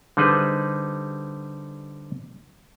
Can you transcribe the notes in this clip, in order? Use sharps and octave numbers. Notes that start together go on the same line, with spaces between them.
D3 G3 D#4 G#4 B4 C5